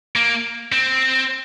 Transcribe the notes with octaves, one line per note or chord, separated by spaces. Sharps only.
A#3
C4